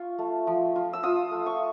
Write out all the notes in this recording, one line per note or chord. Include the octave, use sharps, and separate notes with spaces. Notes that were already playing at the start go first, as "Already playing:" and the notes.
Already playing: F4 C#6
A3
F3
F4
E6
F4 D#6
A3
C#6